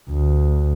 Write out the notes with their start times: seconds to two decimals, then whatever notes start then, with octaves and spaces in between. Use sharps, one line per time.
0.10 D2